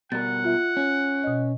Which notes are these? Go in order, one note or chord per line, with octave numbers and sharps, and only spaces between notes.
B2 G3 A#4 F#5 A6
F4 E5
C#4
B2 D#5